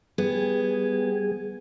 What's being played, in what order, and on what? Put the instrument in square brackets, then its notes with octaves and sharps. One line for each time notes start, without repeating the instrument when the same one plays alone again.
[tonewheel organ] G3 G#4 [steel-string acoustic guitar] B3